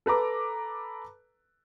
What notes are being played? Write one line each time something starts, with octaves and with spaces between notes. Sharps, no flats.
A4 B4 A#5 D6